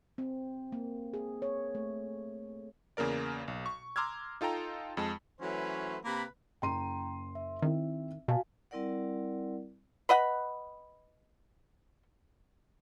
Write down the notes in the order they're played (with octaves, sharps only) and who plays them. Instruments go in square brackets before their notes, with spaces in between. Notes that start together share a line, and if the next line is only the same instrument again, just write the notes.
[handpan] C4
A#3
G#4
C#5
A3
[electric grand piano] E2 C#3 A#3 A#4 D5
B1
C#6
A#5 C6 D6 E6 F6 G#6
D#4 F4 A4 G5 A#5
F2 G#3 A5
[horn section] E3 F#3 A3 C#4 B4 C5
C3 A#3 B4 B5
[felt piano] F#1 C6 D#7 [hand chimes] G5 A#5
[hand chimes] E5
[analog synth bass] D#3 [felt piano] C4 E4
[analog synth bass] B2 [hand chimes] F#4 F5 G#5 [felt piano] A5
[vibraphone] G3 C4 E4 A#4 D5 F#5
[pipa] B4 D#5 F#5 B5